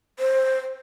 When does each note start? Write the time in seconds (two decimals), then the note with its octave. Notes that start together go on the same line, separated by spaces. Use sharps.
0.19 C5